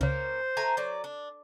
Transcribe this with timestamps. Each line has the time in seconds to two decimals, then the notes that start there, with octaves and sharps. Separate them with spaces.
0.01 C#2 C#3 A#3 C#4 C5
0.57 A3 G#5 A#5
0.77 F#3 D5
1.04 D4